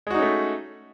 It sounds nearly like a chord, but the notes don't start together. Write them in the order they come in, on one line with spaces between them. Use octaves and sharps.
G#3 F#4 D#4 C#4 A3